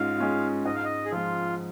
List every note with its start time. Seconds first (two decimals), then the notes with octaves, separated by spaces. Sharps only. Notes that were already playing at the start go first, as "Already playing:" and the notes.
Already playing: G#2 G#3 C#4 F4 F5
0.18 G#3 C#4 F4
0.65 G#2 D#5
0.75 F5
0.85 D#5
1.05 G#4
1.12 F3 G#3 F4